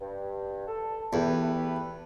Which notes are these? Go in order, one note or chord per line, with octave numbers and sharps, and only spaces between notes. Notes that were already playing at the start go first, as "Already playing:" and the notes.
G2
A4
E2 A3 G4 B4